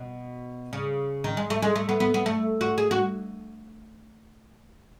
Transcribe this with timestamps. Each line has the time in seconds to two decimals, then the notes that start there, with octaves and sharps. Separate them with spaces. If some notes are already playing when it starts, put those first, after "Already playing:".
Already playing: B2
0.73 C#3
1.24 D#3
1.37 G#3
1.50 A3
1.62 G#3
1.76 A3
1.89 B3
2.00 B3
2.14 B3
2.26 A3
2.61 F#4
2.78 G#4
2.91 F#4